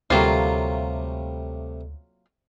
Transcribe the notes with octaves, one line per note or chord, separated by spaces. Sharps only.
D2 C3 F#3 G3 A3 A#3 F4